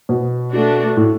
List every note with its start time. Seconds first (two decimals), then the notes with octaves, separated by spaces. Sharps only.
0.09 B2
0.53 A3 D4 F#4
0.97 A2